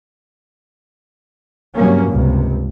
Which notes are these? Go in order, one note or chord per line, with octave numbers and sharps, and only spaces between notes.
G2 C3 F#3 A#3 C#4
C#2 G2 C3